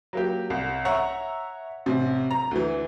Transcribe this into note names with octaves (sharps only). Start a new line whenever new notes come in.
F#3 A#3 G4
C2
C#5 E5 F#5 A#5
A1 C3
A#5
D2 E3